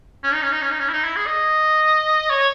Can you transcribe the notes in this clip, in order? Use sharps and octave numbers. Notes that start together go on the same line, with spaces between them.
C#4
D#4
C#4
D#4
C#4
D#4
C#4
E4
D#4
E4
G#4
D#5
C#5